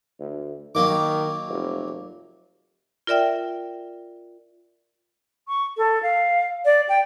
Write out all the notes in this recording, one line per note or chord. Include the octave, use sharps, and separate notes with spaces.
D2
D#3 F#3 A#3 D6
F1
F4 A#4 D5 E5 G5
C#6
A4
F5
D5
G5